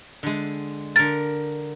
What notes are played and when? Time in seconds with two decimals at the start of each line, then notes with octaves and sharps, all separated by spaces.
0.23 D3 G#3
0.96 D3 A#4 A6